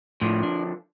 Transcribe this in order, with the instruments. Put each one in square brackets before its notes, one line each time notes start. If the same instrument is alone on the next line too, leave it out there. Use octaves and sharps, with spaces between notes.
[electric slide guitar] A2 [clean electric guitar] D3 F3
[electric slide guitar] D4